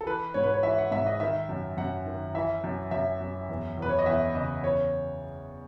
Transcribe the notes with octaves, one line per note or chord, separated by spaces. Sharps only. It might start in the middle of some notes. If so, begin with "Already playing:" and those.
A4
E3 B4
G#2 C#5
B4
C#5
E3 E5
F#5
G#2 E5
D#5
D#3 E5
F#2
F#2 F#5
D#3
E3 E5
F#2
F#2 E5
F#2
E2
E2 B4
C#5
D#5
E2 E5
C#3 D#5
E2 C#5